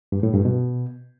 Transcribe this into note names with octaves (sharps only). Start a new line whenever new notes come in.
G2
A2
G2
B2